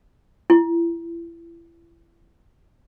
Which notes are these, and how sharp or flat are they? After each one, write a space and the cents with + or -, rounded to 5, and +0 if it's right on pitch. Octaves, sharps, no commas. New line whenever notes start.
E4 +30